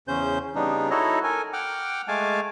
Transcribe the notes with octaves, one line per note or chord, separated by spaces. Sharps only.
E2 C#3 C#4 C5 G6
C#3 G3 B3 D4 D#4
D#4 E4 F#4 A4 C#5 D#5
A4 A#4 G#5
F#5 G5 D6 F6
G#3 A3 F5 G#5 A5 D6